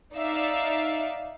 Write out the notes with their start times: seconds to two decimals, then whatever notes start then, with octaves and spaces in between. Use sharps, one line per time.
0.14 D#4 D5 E5 F5